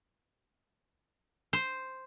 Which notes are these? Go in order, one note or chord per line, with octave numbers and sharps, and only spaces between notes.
C5